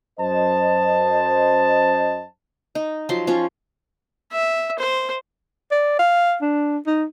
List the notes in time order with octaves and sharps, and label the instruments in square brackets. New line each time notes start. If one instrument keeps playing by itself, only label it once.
[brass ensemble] F#2 C5 D#5 A5
[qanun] D#4
F3 F#3 C6
F3 C#4 F4 C#5
[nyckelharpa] E5
C5
[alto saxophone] D5
F5
D4
D#4